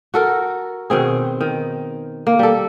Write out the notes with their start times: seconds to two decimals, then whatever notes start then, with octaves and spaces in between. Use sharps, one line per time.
0.14 F#4 A4 A#4
0.90 B2 D#3 C4 G#4
1.41 D#3
2.27 A#3
2.39 G3 A4